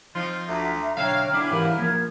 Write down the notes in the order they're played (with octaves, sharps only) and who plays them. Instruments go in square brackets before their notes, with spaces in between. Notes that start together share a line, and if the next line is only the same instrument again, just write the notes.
[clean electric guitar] F3 [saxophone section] C4 D#4 F4
[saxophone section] D2 [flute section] E5 [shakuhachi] A#5
[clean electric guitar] B1 D3 E5 [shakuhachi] C#5 [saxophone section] F5 [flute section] G5 A#5 F6
[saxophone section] C#3 B3 E4 [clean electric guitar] D4 [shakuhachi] D6
[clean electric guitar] G#2 E3 B4 [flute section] G4 F5 [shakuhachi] A#4
[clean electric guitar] F3 A#3 [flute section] G#6